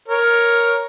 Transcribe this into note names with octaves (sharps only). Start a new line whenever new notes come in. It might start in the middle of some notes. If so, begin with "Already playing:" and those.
A#4 C#5